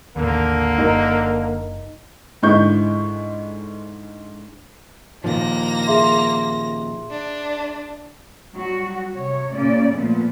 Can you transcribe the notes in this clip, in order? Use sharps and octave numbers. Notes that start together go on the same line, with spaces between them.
A1 D#2 D3 A#3
F#1 D#4 A#4
G#2 D3 G#3 E4 C#6 G6
A#2 D#3 F3 A#3 A#6
G#4 E5 C6
D4
F#3 G3 F#4
C3 C#5
A#2 C#3 C#4 D5
A#2 F3 A3 B3